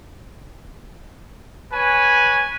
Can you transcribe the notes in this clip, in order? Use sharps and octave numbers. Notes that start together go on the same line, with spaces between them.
B4 C#5 G#5